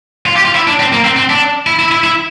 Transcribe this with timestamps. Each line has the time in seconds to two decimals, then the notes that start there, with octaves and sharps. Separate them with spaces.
0.26 F4
0.36 G4
0.45 F4
0.55 E4
0.68 D4
0.80 C4
0.93 A#3
1.05 C4
1.16 C4
1.30 D4
1.67 E4
1.79 E4
1.92 E4
2.04 E4